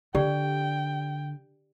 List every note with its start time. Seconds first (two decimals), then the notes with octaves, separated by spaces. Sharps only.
0.15 D3 G4 D5 G5